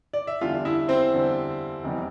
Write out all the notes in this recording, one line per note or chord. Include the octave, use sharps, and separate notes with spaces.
D5
E5
E2 D3 G3 F4 F5
E4 E5
C4 C5
E2 D3 G3
F1 E2 C3 E3 G3